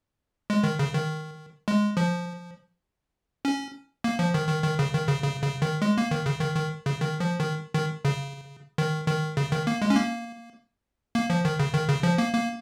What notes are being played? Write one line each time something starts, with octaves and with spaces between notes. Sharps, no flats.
G#3
D#3
C#3
D#3
G#3
F3
C#4
A#3
F3
D#3
D#3
D#3
C#3
D#3
C#3
C#3
C#3
D#3
G#3
A#3
D#3
C#3
D#3
D#3
C#3
D#3
F3
D#3
D#3
C#3
D#3
D#3
C#3
D#3
A#3
G#3
C#4
A#3
A#3
F3
D#3
C#3
D#3
C#3
F3
A#3
A#3